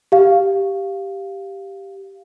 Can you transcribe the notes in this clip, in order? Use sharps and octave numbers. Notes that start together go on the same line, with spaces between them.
G4 F5